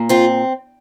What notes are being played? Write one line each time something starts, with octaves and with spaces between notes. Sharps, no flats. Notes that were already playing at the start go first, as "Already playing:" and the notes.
Already playing: A#2
C4 F4